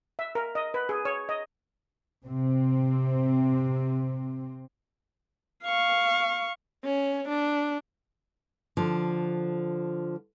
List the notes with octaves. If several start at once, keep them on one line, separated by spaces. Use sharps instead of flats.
E5
A#4
D#5
B4
G#4
C#5
D#5
C3 C4
F5 C#6
C#4
D4
D3 F3